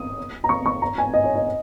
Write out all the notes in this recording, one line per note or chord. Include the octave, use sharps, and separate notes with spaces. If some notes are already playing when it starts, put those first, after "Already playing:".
Already playing: D#6
A#5
C#6
C#6
A#5
G#5
D#5
C#5
D#5